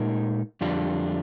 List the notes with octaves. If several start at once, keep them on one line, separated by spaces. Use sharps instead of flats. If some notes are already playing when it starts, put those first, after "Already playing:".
Already playing: A#2 G#3 D#4 A#4
F2 D3 G3 D4 F4